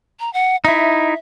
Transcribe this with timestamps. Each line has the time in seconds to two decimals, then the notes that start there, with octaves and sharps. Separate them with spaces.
0.20 A#5
0.34 F#5
0.65 D#4 E4 E5